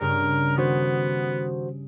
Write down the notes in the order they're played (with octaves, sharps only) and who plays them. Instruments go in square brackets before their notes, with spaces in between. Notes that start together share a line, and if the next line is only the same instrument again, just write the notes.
[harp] G2 C#3 [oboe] A#4
[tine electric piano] D#3 F#4 C5 [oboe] B3